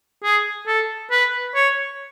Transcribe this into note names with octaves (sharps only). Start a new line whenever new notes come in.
G#4
A4
B4
C#5